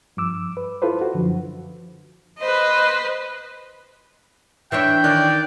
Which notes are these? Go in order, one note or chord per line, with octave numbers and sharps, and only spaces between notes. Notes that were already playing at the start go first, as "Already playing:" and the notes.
G2 F3 D6 E6
B4
E4 F4 A4 B4 C5
F#4
F#2 D3 F3
B4 C5 D#5
E3 D4 C#5 E5 G5
D#3 D5 F#6